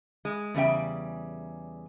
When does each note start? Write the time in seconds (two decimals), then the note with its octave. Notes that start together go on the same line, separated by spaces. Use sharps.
0.25 G#3
0.54 E2 C#3 G3 E5 G5